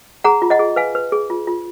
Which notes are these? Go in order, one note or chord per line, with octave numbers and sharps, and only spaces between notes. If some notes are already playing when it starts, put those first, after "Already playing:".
G#4 F#5 A#5
F4
D#5 F#5
G#4
B4 F5 G#5
B4
G#4
F4
F4